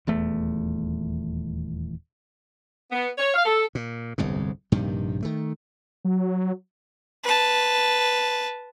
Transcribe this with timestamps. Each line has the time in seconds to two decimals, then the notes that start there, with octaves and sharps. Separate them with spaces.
0.07 D#1 E2 A3
2.92 B3
3.18 C#5
3.34 F5
3.46 A4
3.75 A#2
4.18 G1 C2 F2 G#2
4.72 A#1 G2 C3 D#3
5.22 D#3 A3
6.05 F#3
7.24 B4 A5